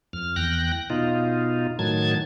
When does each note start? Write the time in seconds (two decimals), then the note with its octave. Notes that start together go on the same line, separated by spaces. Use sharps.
0.13 F2 F6
0.36 E2 G5 F#6 A#6
0.90 B2 D#4 F4
1.79 A2 D#3 F#3 A5 G#6